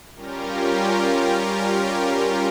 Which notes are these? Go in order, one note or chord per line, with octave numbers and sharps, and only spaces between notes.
G3 C#4 F4 G4 A#4